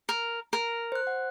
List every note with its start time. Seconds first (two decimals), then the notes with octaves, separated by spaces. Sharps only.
0.09 A#4
0.53 A#4
0.92 C5 F#6
1.07 F#5